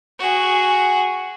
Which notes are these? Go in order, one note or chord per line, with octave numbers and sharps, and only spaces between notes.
F#4 G#4